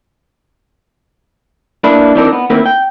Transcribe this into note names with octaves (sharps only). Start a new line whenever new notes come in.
A#3 D4 E4 B4
E3 C4 D4 D#4 A#4
B3
D#3 A#3 C4 E4 A#4 B4
G5